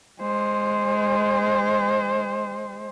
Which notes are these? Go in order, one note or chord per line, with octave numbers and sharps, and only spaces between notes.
G#3 C5